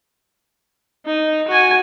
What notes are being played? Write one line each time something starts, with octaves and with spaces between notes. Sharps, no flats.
D#4
F#4 G#5